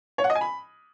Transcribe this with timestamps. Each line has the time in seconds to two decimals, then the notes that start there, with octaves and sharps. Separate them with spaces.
0.18 C#5
0.24 F#5
0.30 D#5
0.35 G#5
0.41 B5